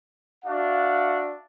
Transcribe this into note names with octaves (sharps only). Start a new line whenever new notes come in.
D4 F#4 E5 F5